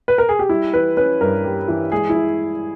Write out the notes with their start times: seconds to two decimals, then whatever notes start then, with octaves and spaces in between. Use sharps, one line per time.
0.08 B4
0.18 A#4
0.29 G#4
0.39 G4
0.49 G3 E4
0.74 E3 B4
0.97 C#4 B4
1.21 G2 A#4
1.44 G3
1.68 E3
1.92 G#3 G#4
2.09 E4
2.15 E3